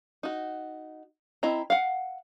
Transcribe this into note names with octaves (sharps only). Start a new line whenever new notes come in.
D#4 F#4
C4 E4 D#5 A#5
F5 F#5